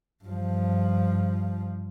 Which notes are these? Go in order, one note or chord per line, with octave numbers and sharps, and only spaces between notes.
G2 F3